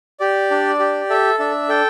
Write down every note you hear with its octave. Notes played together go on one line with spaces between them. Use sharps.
G4 D5
D4
G4
A4 E5
D4 E5
A4 G5